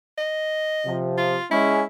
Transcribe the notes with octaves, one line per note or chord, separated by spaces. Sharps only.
D#5
C3 F3
F4
G#3 C#4 E4